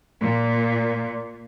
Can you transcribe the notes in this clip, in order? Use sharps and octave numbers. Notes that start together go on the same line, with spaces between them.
A#2